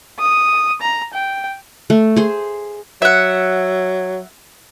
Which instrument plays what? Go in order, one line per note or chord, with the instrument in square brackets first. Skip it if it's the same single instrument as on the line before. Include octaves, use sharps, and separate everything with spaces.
[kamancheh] D#6
A#5
G5
[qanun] A3
G#4 C5
[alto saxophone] F#3 [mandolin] E5 F#5